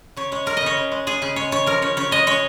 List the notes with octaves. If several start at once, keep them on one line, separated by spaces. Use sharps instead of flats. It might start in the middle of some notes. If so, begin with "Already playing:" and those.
C#3 C#5
G#3 C#5
G#3 A#4
D#5
C#3 C#5
C#3
G#3
G#3 G#4
C#3 G#4
G#3 C#5
C#3 C#5
F3 A#4
C#3 C#5
C#3 C#5
G#3 D#5
G#3 C#5